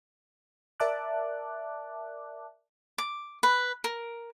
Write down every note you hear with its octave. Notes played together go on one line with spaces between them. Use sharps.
A#4 D5 E5 A5 D6 F#6
D6
B4
A#4